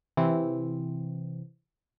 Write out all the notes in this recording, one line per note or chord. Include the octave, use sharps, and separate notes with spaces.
C3 E3 C4